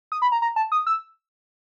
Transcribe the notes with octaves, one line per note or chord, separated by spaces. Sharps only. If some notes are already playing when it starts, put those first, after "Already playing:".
D#6
B5
A#5
A#5
A5
D#6
E6